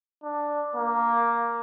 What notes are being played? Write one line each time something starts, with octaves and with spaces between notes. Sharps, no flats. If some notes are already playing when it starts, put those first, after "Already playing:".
D4
A#3